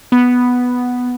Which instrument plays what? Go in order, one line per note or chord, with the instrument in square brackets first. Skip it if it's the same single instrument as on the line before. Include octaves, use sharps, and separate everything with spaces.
[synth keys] B3